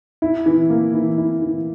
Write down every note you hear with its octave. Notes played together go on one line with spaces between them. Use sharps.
E4
E3
A#3
E3
E4
E3